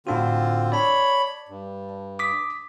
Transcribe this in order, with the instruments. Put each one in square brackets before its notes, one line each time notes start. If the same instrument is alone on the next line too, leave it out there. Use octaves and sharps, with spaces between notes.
[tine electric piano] A2 D4 F#4 [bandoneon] D3 C4 F4
[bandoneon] C#5 B5 [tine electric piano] D5 A5
[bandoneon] G2
[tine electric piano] D6 D#6 B6